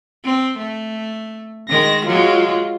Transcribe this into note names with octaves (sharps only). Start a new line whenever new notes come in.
C4
A3
D#3 G#3 A#6
F#3 G#3 F4